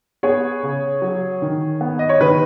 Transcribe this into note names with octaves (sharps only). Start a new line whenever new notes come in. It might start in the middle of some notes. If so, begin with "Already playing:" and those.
B3 G#4 C#5
C#3
F#3
D#3
B3
D#5
C#5
D#3 B4